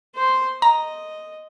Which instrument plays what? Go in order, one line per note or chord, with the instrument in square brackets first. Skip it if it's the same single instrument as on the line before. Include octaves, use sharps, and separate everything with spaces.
[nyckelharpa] C5 C6
[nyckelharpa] D#5 [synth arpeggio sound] A#5